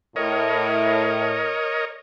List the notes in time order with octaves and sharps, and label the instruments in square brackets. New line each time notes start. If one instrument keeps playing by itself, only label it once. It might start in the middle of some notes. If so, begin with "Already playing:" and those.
[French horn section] A2 [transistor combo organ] A#4 C#5 D#5